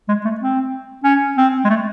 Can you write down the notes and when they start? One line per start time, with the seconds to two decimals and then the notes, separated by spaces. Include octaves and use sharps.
0.08 G#3
0.25 A3
0.41 C4
1.04 C#4
1.38 C4
1.65 G#3
1.70 A3